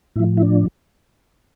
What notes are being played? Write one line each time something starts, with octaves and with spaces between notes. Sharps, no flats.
A2 F3 E4
E4
D4